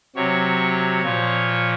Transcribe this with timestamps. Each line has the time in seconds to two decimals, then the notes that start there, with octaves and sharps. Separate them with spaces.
0.16 C3 F#3 C#5
1.02 A#2 F3